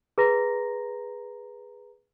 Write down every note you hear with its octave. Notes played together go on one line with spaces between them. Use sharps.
G#4 B4 A#5 C6 A#6